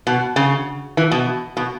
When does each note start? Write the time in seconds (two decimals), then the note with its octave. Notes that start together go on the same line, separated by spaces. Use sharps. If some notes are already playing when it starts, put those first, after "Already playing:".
0.07 B2
0.36 C#3
0.97 E3
1.11 B2
1.57 B2